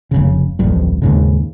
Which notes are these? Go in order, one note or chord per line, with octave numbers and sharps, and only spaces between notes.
F1 A#1 C#3
D1 A1 F2 G3
D#2 G#2 C#3